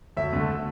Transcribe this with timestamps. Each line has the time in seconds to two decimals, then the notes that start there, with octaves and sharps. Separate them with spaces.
0.17 D2 E5
0.33 D3 A3